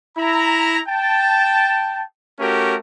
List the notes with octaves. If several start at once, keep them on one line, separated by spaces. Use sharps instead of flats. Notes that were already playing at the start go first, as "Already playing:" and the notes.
E4 A#5
G5 A5
A3 C#4 F#4 G4 A#4